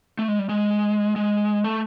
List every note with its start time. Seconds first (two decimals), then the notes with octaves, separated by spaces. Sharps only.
0.19 A3
0.28 G#3
0.39 G3
0.49 G#3
1.16 G#3
1.64 A3